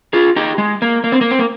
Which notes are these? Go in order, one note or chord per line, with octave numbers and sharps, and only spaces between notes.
F4 G#4
D#4 G4
G#3
A#3
A#3
C4
A#3
C4
A#3